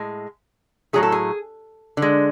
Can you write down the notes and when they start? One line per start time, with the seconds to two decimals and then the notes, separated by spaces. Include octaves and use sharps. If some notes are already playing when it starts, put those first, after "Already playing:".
Already playing: A2 G#3
0.93 A2 F#3 A3 G#4
1.03 A4
1.12 G#4
1.97 D3
2.02 G#3